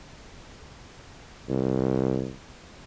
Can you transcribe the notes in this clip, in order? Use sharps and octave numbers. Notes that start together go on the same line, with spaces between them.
C2